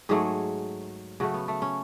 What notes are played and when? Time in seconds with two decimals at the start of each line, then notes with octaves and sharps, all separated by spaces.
0.09 G#2 F#3 A3 G#4
1.20 C#3 F#3 A3 F#4
1.34 B3
1.48 A3
1.62 C#4